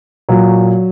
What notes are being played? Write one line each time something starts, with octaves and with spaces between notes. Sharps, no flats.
A#2 F#3